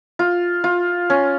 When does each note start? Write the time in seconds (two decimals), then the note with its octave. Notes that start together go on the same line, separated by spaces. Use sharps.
0.19 F4
0.64 F4
1.10 C#4